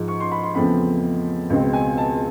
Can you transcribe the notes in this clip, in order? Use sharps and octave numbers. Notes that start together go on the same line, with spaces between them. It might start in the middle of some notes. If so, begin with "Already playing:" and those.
Already playing: G#2 F3 G#3
C#6
C6
B5
C6
E2 C#3 F3 A3 C4 B5
C#2 B2 G#3 C4
G#5
A5